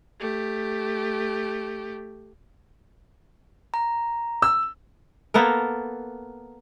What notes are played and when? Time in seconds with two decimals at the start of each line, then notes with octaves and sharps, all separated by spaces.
0.20 A3 G4
3.74 A#5
4.42 E6
5.34 A#3 B3 A4 A#4